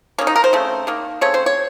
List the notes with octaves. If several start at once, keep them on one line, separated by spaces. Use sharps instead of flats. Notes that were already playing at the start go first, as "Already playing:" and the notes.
D#3 A#3 C#4
D#4
A#4
C5
C#3 A3 C4
D#3 A#3
C#3 A3 C4 C#5
C5
C#5